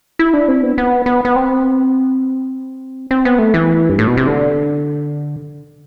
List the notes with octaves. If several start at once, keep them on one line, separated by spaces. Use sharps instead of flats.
E4
D4
C4
B3
B3
B3
B3
C4
C4
B3
A3
E3
G2
A2
B2
C3
D3